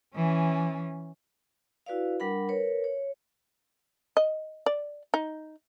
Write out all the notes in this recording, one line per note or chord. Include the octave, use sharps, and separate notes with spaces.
E3 C#4
E4 F#4 B4 D5 F5
G3 D4 A#4 F#5 B5
A#4 B4 C#5
C#5
D#5
D5
D#4